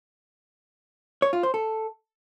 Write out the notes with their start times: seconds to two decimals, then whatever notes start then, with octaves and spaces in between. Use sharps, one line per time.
1.22 C#5
1.33 F4
1.43 C5
1.54 A4